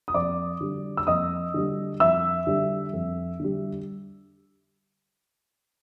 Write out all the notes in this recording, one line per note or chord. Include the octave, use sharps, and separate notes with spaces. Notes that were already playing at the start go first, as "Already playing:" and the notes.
D#6
F2 D5 D6
D3 G3
E6
F2 D#5 D#6
D3 G3
F2 E5 E6
D3 G3
F2
D3 G3